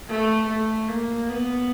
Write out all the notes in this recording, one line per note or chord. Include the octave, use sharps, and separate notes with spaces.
A3
A3
A#3
B3